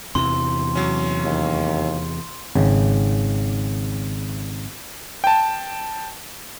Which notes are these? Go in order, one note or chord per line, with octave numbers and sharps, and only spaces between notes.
E2 C3 E3 C6
F#3 C#4
D#2
G#1 C#3
G5 A5